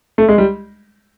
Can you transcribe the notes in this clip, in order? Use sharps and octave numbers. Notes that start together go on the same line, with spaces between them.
A3
G#3
G3